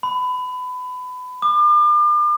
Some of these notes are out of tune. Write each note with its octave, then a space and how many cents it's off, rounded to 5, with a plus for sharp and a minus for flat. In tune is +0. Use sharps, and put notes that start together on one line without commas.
B5 +25
D6 +40